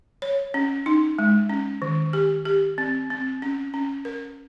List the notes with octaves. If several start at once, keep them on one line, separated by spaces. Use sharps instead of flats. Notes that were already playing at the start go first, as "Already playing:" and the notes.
C#5
C#4
D#4
G#3
C#4
D#3
G4
G4
C4
C4
C#4
C#4
A#4